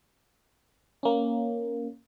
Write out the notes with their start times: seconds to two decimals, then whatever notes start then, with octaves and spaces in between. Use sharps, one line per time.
1.03 A#3 C#4